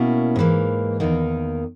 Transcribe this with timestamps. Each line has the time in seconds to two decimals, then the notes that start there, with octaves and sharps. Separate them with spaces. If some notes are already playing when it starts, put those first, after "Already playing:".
Already playing: B2 A#3 C#4 E4
0.36 G#2 E3 A#3
1.00 E2 D#3 A#3 D#4